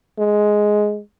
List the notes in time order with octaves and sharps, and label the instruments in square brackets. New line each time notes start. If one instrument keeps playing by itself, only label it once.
[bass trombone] G#3